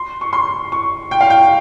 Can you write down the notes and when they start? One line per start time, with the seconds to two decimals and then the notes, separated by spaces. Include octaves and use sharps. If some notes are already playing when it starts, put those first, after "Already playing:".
Already playing: C6
0.21 C#6
0.33 C6
0.72 C#6
1.11 G5
1.21 F5
1.30 G5